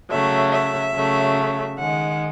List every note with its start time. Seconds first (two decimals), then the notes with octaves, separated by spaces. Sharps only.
0.10 C#3 F#3 A3 E5
0.51 E5
0.93 C#3 F#3 A3
1.76 D#3 G#3 F#5